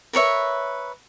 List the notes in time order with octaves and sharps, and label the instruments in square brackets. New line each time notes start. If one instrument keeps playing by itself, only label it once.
[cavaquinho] A#4 B4 C#5 E5